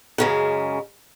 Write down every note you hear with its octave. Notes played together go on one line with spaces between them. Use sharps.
F#2 C#3 G#3